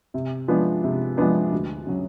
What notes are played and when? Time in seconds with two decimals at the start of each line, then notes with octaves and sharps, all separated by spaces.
0.14 C3
0.48 F3 G#3 B3 D4
0.84 C3
1.17 F3 G#3 B3 D4
1.52 D2
1.87 C#3 F#3